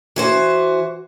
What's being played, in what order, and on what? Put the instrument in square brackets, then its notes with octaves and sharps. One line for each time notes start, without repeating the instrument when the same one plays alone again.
[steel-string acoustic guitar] E3 F#4 C5